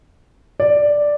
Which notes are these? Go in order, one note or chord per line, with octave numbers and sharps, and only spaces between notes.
D5